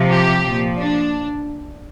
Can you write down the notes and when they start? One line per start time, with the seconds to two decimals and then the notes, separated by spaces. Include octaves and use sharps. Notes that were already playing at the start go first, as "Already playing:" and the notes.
Already playing: C3 F3
0.10 G4
0.43 A#2 F3
0.77 D4